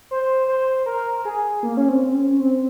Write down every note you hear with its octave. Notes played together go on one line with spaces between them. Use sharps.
C5
C5
A#4
G#4
A#3
C#4
C4
C#4
C4